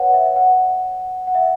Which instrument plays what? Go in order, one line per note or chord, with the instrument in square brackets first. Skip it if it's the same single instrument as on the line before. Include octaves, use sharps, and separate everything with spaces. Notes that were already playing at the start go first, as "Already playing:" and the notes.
Already playing: [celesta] B4 C#5 F#5
E5
F#5
F#5
E5